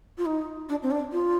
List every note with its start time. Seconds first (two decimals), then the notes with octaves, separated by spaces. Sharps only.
0.18 F4
0.26 D#4
0.69 D4
0.83 C4
0.91 D4
1.12 F4